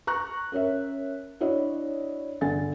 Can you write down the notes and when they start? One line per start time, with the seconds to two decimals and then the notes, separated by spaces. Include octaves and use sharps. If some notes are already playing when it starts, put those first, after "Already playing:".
0.07 A#5 C#6 F#6
0.52 C#4 A#4 C#5 E5
1.41 D4 E4 F#4 C#5 D#5
2.41 G1 D3 G#5 A6